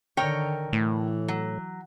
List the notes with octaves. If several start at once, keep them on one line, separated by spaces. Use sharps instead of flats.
D3 D#3 A#4 C#5 G5
A2 E3
F#3